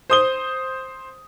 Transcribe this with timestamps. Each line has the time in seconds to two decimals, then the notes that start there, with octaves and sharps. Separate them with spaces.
0.10 C5 D#6 G7